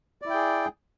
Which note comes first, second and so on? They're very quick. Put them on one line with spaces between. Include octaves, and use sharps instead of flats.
D5 E4 G5 G#4